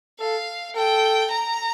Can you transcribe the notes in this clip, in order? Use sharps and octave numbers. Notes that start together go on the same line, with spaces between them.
A4 F5
A4 G5
A#5